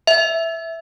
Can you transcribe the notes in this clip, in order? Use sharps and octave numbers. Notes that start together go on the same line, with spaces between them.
E5